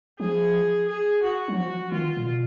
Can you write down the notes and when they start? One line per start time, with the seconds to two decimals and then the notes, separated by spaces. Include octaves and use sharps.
0.19 F3 G#4
0.88 G#4
1.23 F#4
1.48 F#3
1.57 F3 F#4
1.92 D#3 F4
2.17 A#2
2.26 B2